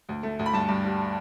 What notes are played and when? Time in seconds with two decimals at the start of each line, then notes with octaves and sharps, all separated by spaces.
0.09 D2
0.23 A3
0.39 D2
0.46 B5
0.53 G2 A5
0.68 G2
0.84 G3